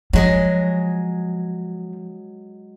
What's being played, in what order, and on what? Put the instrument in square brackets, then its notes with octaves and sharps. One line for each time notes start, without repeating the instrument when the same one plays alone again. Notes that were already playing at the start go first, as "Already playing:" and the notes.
[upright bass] F3 [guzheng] F#3 G#3 G#4